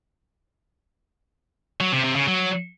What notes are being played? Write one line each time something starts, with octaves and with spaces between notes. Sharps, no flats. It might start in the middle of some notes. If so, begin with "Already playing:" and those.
F#3
C3
C3
C#3
F#3